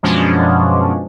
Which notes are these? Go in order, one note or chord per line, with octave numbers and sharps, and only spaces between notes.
F#2 B2 F3 G#3 C#4 D4